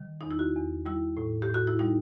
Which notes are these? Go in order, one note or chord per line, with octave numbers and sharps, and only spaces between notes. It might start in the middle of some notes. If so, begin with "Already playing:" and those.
Already playing: D#3 G3
E2 D#4
E4
F#4
E2
G3 E4
A2
G4
A2
F#4
E4
G3 D#4